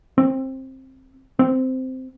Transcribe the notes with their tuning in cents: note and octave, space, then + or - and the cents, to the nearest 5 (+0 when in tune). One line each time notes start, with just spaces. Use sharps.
C4 +15
C4 -10